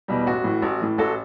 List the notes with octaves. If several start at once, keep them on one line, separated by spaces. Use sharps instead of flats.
E2 B2 G3
A1 F#4
A2 E3
A1
A2 E3
A1 F#4 A4